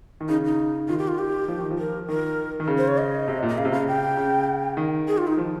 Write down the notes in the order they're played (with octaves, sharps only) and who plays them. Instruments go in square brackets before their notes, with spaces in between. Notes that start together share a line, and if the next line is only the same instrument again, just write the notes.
[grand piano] D#3
[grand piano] C#3 [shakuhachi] D#4
[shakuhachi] D#4
[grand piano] D#3 [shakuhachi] F4
[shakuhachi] G4
F4
G4
[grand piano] F3
D#3
F3
[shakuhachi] A#4
[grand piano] D#3 [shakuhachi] A#4
[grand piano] D#3
C#3
[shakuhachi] C5
C#5
D#5
[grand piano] C3
A#2
[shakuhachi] D#5
[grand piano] C#3 [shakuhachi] F5
[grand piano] C3
[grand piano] C#3 [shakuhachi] F5
[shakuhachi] G5
[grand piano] C#3
D#3
[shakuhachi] G#4
F4
D#4
[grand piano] F3